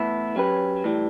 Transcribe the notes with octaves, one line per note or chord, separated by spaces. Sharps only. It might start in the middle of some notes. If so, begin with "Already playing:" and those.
Already playing: A2 E3 B3 E4
F#3 C#4 G4 B4
A2 E3 G3